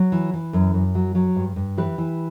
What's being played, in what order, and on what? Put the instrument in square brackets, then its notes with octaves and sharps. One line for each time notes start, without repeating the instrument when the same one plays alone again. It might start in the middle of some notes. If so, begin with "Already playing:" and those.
Already playing: [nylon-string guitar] F#3
E3
E3
F#2
F#2
F#3
F#3
G2
G2
E3 G4 B4
E3